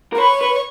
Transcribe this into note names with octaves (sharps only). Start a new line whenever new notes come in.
A#4
B4 C#5
B4